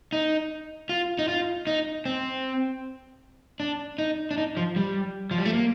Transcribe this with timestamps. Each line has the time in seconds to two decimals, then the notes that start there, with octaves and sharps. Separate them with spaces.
0.13 D#4
0.89 F4
1.19 D#4
1.28 F4
1.67 D#4
2.05 C4
3.60 D4
3.98 D#4
4.31 D4
4.38 D#4
4.57 F3
4.76 G3
5.31 F3
5.38 G3
5.45 A3
5.53 A#3